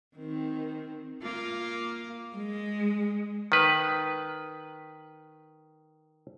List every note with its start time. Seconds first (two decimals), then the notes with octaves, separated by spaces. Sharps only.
0.16 D#3 C4
1.22 A#3 F4
2.37 G#3
3.52 D#3 B4